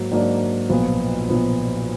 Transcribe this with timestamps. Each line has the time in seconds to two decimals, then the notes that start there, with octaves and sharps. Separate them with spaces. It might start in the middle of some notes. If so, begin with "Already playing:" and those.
Already playing: G#2 F#3 A#3
0.11 G#2 F#3 A#3 D4
0.70 B1 A#2 F3 B3
1.29 B1 A#2 F3 B3